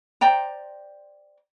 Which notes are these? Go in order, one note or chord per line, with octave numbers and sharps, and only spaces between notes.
C5 D5 G5 A#5